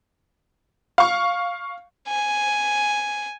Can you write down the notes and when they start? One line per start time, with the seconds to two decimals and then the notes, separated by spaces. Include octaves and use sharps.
0.98 F5 C#6
2.08 G#5